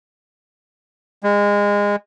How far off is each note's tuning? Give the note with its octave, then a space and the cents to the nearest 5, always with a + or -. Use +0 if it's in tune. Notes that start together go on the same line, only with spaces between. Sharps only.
G#3 -25